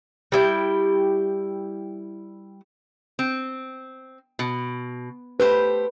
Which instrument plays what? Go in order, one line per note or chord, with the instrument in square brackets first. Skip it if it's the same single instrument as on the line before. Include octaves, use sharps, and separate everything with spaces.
[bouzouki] G3 E4 G5
[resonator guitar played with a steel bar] C4
B2
[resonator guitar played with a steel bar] A3 G4 C5 [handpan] B4